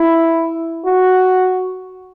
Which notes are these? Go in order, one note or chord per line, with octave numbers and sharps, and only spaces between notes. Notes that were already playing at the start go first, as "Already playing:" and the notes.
Already playing: E4
F#4